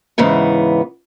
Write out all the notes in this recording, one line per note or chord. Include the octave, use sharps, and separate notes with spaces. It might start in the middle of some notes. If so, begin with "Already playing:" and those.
E2 G#2 C#3 E3 B3